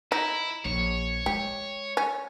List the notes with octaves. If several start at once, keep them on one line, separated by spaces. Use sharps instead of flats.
D#4 E4
A#1 C#5
G#3 G4
C#4